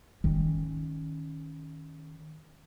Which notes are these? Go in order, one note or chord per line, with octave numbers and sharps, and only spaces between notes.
D#3 C#4